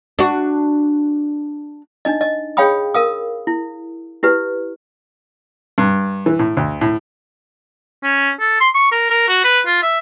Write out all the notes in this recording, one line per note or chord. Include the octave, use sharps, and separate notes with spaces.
D4 F#4
D4 D#4 D#5
D#5
G#4 C#5 F5 G5 B5 D#6
A#4 F5 D#6
E4
E4 G4 B4
G2
E3
A2
D2
A2
C#4
A4
C6
C#6
A#4
A#4
F#4
B4
F4
E5